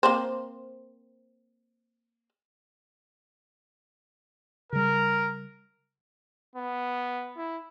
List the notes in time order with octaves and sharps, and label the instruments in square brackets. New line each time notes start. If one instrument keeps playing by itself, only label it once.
[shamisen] A#3 C4 C5
[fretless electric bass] C#3 G3 [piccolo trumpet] A#4
[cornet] B3
E4